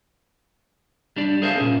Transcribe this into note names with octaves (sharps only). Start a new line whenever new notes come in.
G3 D4 D5
G#4 A#4 C5 E5 F5 A5
A#2 C#4